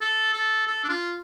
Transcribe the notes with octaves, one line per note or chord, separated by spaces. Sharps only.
A4
A4
A4
D4
F4